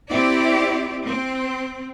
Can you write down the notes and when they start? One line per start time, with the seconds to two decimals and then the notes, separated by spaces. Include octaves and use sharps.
0.11 C4 E4 G4 D5
1.06 C4